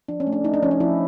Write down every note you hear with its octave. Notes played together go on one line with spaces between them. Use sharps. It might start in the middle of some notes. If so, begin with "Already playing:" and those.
F3 D4
C#4
A3
D4
A3 D#4
D4
F3 C#4
D4
F3 E4